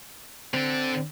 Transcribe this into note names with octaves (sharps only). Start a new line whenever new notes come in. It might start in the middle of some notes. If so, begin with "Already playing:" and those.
D3 C4 A4